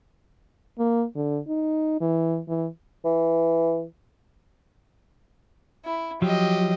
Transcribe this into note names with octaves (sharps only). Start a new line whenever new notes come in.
A#3
D3
D#4
E3
E3
E3
E4
F3 F#3 G4 D#5